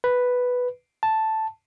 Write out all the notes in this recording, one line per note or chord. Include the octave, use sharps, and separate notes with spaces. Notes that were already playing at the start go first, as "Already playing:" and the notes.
B4
A5